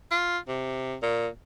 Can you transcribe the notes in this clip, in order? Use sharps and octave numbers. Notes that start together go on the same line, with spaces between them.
F4
C3
A#2